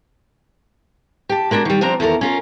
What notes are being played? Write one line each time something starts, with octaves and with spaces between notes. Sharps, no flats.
G4 A5
G#3 A#3 D4 F#4
D#3 G3
F3 C4 D4 A#5
E2 D#3 A4 A#4
C#4 F4 A#4